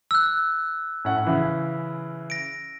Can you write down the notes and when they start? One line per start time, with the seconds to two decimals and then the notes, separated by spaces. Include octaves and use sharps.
0.11 E6 F#6
1.05 A2 C#4 F#5
1.25 C#3 E3 E4
2.30 A#6 D7